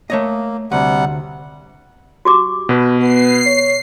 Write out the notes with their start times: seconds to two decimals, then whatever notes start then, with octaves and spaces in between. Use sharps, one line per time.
0.10 A3 A#3 C#5 D#5
0.72 D2 C3 G3 F#5
2.25 F#4 G4 D6
2.69 B2 B4
3.00 B3 C7
3.46 C#5